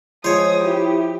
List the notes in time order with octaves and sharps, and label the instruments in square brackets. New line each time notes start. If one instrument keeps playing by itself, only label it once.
[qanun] F3 [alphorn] G#3 [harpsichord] C5 C#5 [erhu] D#6
[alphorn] E4 [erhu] G4